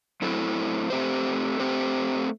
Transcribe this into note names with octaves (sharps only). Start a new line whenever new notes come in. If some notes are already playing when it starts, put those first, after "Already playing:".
A2 F#3 C4 E4 A4
A3 C4 G4 C5
A3 C4 G4 C5